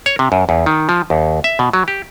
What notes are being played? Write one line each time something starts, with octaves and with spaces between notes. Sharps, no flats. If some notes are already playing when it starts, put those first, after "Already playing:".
C#5
C3
F#2
E2
D#3
F3
D#2
E5
B2
F#3
G4